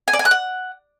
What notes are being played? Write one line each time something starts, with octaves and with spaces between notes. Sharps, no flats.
G#5
D5
G#5
F#6
F#5